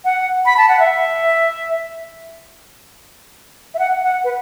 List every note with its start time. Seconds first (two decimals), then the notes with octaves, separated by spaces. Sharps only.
0.05 F#5
0.46 B5
0.57 A5
0.69 F#5
0.80 E5
3.74 E5
3.79 F#5
4.03 F#5
4.24 B4